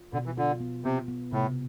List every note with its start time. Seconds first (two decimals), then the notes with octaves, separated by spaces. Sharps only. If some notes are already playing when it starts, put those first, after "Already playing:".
Already playing: F4
0.13 B2 D3
0.26 E3
0.38 D3 F4
0.60 B3
0.84 C3 B3
1.08 B3
1.32 A2 C3